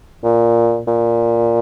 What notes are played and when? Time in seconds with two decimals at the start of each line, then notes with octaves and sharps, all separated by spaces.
0.24 A#2
0.87 A#2